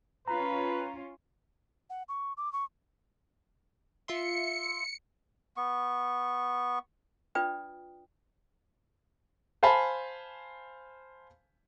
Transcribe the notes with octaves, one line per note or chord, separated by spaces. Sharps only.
C#4 F4 B4 A#5
F#5
C#6
D6
C#6
F4 E5 C6 C#7
B3 C#6
D4 F4 B4 D5 G5 D#6
C5 F5 G#5 A5 B5